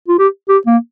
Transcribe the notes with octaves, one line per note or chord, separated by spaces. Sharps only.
F4
G4
G4
A#3